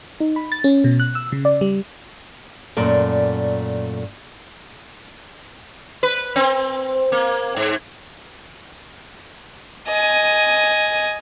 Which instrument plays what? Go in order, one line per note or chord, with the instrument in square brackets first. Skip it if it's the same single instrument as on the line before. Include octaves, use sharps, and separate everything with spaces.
[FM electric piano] D#4
B5
A6
C#4
B2
F#6
E6
C#3
D5
G3
[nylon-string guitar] F#2 A#2 A3 D5
[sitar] B4
C4
A#3
G#2
[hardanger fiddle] D#5 G#5